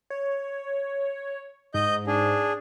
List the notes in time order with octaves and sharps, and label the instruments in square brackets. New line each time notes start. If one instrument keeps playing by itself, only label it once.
[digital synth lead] C#5
[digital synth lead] G#2 [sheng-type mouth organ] D#5 G6
[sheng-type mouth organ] D4 G#4